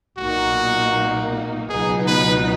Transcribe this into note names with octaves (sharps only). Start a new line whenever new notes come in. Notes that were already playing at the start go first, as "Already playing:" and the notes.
B1 A#2 A#3 D#4 F#4
C#2 B2 F#3 B3 D#4 G#4
B4